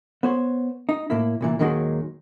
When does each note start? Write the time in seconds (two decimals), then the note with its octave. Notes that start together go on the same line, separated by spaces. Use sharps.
0.23 B3 C5 C#5
0.89 D#4
1.10 A2 A#3 E4
1.41 C2 A#2 E3
1.59 D#2 A#2 D#3 F#3 G#3